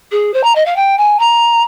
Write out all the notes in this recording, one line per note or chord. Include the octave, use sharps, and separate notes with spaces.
G#4
C5
A#5
D#5
F5
G5
G#5
A#5